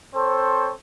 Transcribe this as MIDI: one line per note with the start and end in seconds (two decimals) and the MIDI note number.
0.15 0.72 60
0.15 0.72 69
0.15 0.72 72
0.15 0.72 73